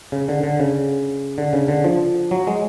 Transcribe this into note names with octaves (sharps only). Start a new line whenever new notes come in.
C#3
D3
D3
C#3
D3
C#3
D3
F3
F#3
G#3